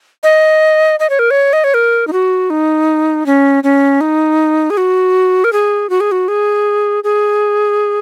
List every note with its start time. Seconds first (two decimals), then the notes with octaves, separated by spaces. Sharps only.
0.23 D#5
1.00 D#5
1.10 C#5
1.19 A#4
1.31 C#5
1.53 D#5
1.64 C#5
1.74 A#4
2.07 D#4
2.13 F#4
2.50 D#4
3.26 C#4
3.64 C#4
4.01 D#4
4.70 G#4
4.77 F#4
5.44 A#4
5.53 G#4
5.90 F#4
6.00 G#4
6.12 F#4
6.28 G#4
7.04 G#4